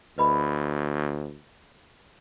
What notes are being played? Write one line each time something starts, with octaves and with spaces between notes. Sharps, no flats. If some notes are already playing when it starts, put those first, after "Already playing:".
D2 B4 D#5 B5